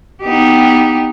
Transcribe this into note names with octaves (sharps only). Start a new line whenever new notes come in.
B3 D#4 G4